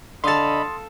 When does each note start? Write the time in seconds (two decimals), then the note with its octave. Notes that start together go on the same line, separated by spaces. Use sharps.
0.24 D3 A4 D#5 F5 B5 C6 D#6 A6